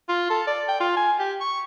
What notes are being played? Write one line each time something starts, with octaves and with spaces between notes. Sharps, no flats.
F4
A4
D5
G5
F4
G#5
G4
C#6